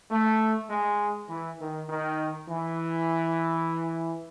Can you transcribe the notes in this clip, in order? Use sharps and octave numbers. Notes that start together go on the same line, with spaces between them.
A3
G#3
E3
D#3
D#3
E3